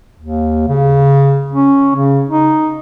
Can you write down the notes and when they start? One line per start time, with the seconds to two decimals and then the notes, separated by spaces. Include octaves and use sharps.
0.20 D#2
0.68 C#3
1.54 C#4
1.96 C#3
2.30 D#4